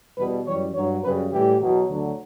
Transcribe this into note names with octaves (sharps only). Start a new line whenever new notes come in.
E2 B2 G3 B4
F#2 E3 G3 C#5
G2 F#3 C#5
F#2 C#3 G3 B4
A2 E3 G3 G4
E2 B2 F#3
D2 D3 F#3